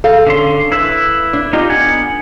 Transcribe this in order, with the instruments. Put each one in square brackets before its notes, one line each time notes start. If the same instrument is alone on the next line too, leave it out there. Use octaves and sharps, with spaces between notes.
[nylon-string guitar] A4 F5
[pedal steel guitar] D3 C#4 C6
E4 B4 E5
[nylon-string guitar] D4
[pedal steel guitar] D#4 F4 G4
B3 F#5 G#5